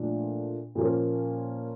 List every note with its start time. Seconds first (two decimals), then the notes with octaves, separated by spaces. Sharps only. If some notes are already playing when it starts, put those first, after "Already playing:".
Already playing: A#2 F3 A3 D4
0.75 A#2 F3 A#3 C#4